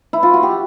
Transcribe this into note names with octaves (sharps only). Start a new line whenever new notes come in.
E4
F4
F#4
G4